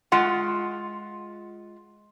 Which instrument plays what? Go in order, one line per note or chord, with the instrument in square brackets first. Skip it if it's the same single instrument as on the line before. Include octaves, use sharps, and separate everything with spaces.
[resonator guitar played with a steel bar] G#3 F4 F#5